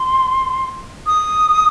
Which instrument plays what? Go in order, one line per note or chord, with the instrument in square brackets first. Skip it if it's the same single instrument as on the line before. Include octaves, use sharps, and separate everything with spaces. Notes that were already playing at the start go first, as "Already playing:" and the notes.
Already playing: [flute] C6
D#6